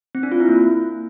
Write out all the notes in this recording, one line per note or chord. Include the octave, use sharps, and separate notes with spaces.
C4
D4
F4
E4
A#3